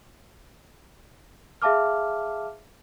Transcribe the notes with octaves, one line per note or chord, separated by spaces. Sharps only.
G#4 E5 F5 A5 D6 F6